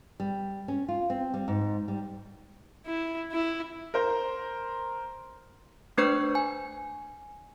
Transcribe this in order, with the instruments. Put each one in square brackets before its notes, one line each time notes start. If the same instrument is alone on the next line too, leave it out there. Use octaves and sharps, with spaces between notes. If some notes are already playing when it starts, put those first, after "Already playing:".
[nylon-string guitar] G3
C#4
F4
C4
G3
G#2
G3
[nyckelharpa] E4
E4
[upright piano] A#4 C5 A#5
[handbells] A3 D4 B4 C5 C#6 G6
G#5